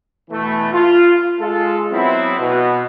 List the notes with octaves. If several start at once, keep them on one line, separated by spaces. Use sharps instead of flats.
B2 E3 A3
F4
G#3 F4 A4
F#3 B3 C4 E4
B2